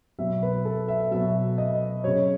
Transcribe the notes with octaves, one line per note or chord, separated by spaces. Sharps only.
B2 F#3 E5
B4
A4
E5
B2 F#3 E5
D#5
C#3 F#3 C#5